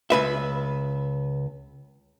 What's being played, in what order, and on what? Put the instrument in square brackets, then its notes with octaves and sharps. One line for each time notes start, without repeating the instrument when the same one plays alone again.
[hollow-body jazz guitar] C#2 B4 E5